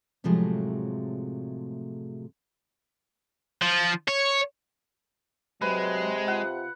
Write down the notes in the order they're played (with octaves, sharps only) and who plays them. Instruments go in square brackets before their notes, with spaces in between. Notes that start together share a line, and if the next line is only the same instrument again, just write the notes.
[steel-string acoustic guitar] A2 C3 F3 F#3 G#3 A3
[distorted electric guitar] F3
C#5
[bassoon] C3 [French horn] F#3 [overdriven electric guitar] G#3 [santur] B4
[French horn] F4 [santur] F#5